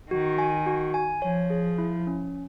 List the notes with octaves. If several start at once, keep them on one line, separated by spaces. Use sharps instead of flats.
D#3 F#4
G#5
F#4
G#5
F3 C#5
G#4
E4
C#4